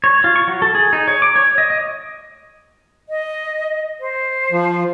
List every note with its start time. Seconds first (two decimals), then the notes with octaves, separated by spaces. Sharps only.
0.04 C#5
0.24 F4
0.36 C#6
0.48 F#3
0.62 A4
0.75 G#4
0.93 D#4
1.08 C#5
1.22 D6
1.36 C#5
1.58 D#5
1.70 D#5
3.09 D#5
4.00 C5
4.52 F3